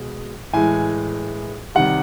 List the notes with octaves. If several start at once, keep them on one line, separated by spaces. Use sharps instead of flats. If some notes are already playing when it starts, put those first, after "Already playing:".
Already playing: B2 G#3
A2 E3 G#3 G#5
C3 D#3 G3 F#5